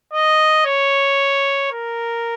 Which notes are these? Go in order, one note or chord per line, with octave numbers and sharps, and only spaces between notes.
D#5
C#5
A#4